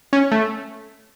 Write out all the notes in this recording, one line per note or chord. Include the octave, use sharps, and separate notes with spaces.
C#4
A3